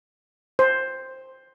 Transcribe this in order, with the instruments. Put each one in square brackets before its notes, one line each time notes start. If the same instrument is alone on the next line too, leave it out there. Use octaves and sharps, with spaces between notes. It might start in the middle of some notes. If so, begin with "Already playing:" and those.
[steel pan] C5